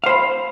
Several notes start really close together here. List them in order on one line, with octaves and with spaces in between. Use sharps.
F5 C5 B5